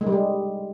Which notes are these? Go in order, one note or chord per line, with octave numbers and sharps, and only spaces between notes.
G#3
G3
G#3